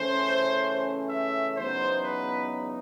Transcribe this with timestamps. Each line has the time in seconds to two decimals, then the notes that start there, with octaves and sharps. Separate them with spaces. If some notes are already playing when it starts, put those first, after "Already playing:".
Already playing: C#3 E3 A3 C#4 C5
1.10 E5
1.57 E2 C#3 F#3 B3 D#4 C5
2.05 B4